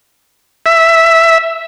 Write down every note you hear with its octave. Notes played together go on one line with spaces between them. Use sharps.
E5